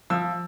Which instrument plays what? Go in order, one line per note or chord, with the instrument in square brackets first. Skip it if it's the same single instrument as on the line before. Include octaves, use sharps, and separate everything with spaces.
[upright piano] F3 E6